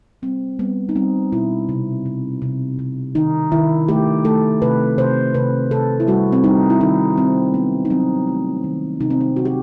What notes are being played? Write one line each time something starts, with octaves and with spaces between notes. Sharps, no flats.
G3 C4
G3 B3
D#4
G3 C4
B2 E4
C3
C3
C3
C3
D#3 D#4
D#3 E4
A3 G4
A3 A4
C3 B4
C3 C5
C3 B4
C3 A4
E4
G3 F#4
C4
G3 D#4
E4
D#3 D#4
G3 C4
F#3 B3
D#4
F#3 C4
A3
D#3
C3 D#4
C4
D#4
C3 F#4
G4